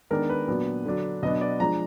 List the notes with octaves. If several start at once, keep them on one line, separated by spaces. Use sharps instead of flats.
D#3 G#3 B3 D4 A#4
B4
A#2 F#3 B3 D4
D3 F#3 D4
B2 F#3 B3 D4 D#5
D5
F3 G#3 D4 A#5